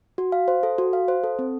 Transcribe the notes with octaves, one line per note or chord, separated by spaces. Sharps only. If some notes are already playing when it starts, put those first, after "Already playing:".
F#4
F5
C5
A4
F#4
F5
C5
A4
C4